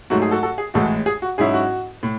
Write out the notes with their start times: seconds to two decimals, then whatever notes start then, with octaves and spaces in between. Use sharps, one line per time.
0.10 G#2 F#3 A3 F#4
0.22 G#4
0.31 F#4 A4
0.43 F#4 A4
0.58 G#4
0.74 A1 A2 G#3 F#4 A4
1.06 G#4
1.22 F#4
1.38 G#2 F#3 C#4 E4 G#4
1.54 F#4
2.03 A2